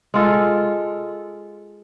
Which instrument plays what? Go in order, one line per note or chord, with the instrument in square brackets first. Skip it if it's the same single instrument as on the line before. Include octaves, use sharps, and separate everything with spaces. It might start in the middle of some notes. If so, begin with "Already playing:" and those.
[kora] G#3 F4 A4